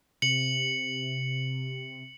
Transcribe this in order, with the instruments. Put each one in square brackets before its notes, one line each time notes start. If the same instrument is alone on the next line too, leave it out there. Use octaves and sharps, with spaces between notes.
[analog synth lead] C3 [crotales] C#7 F#7